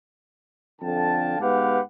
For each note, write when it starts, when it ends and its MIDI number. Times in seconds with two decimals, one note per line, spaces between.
0.81 1.37 41
0.81 1.37 50
0.81 1.37 77
0.81 1.37 79
0.81 1.37 81
1.40 1.80 44
1.40 1.80 59
1.40 1.80 67
1.40 1.80 71
1.40 1.80 77
1.40 1.80 78